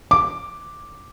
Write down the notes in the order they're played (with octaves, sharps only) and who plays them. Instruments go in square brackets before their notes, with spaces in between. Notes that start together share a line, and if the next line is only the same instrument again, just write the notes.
[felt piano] D6